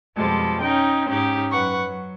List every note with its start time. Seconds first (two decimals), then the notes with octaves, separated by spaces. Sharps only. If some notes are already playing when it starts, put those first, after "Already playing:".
0.16 F2 B2 F3 G3 G#3 A4
0.61 C#4 D#4 D#5 G5
1.09 G#2 C#4 D#4 G4
1.51 F#2 B4 F#5 C#6
1.84 F#3